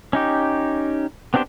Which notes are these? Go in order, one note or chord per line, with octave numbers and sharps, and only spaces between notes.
C#4 D#4 G4
B3 C4 D4 G4 C5